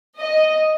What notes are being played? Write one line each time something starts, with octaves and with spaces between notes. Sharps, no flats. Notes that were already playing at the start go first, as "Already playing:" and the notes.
D#5